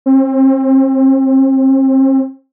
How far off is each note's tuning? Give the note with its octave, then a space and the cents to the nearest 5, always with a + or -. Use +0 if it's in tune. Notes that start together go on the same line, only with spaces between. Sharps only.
C4 +35